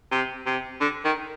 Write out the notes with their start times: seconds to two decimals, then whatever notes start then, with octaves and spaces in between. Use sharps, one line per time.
0.12 C3
0.47 C3
0.81 D3
1.05 D#3